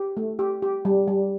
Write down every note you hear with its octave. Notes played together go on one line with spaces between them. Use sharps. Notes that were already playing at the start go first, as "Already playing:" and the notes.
Already playing: G4
A3
G4
G4
G3
G3